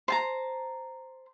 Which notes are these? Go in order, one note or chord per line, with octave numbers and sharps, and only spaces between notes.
C5 A5 A#5